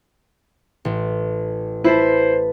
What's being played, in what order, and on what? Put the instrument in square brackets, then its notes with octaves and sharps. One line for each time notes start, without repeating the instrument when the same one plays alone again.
[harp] A1
[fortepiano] E4 [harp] B4 A5 [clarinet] C5